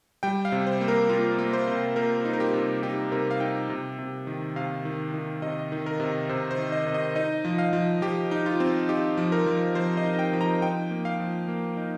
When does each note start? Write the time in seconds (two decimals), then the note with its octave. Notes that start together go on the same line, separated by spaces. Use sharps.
0.23 G3 G5
0.45 F5
0.52 C3
0.67 C5
0.81 A#3
0.88 A#4
1.09 A#3 F4
1.38 A#3
1.53 C5
1.67 C3
1.96 A#3 A#4
2.25 D#4
2.33 A#4
2.40 G4
2.53 C3
2.83 D#4 G4
3.12 C3 A#4
3.31 F5
3.40 D#4 G5
3.69 C3
3.99 C3
4.27 D#3
4.56 C3 F5
4.85 D#3
5.14 D#3
5.42 C3 D#5
5.72 D#3
5.86 A#4
6.00 C3
6.29 C3 C5
6.51 C5
6.58 D#3
6.72 D#5
6.87 C3
6.94 D#5
7.15 D#4 D#5
7.45 F3
7.58 F5
7.73 F3
8.02 F3 G4
8.31 D#4
8.46 F4
8.60 C4
8.89 D#4 G4
9.17 F3
9.32 A#4
9.46 F3
9.75 F3 C5
9.97 D#5
10.04 D#4
10.19 G5
10.33 F3
10.41 A#5
10.62 D#4 G5
10.91 A#3
11.05 F5
11.20 F3
11.48 A#3
11.77 D#4